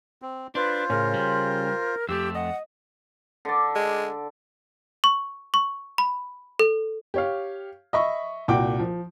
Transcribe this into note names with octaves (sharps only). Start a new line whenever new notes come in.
C4
D4 F4 B4 C5
A2 C#3 C#4 A#4
G3
F2 A3 G4 E6
D#5 F#5
D3 D5
G#3
C#6
C#6
B5
A4
G4 C#5 F5
D#5 E5 B5 C#6
C2 A#2 F#4 F#5 G5 D6
F3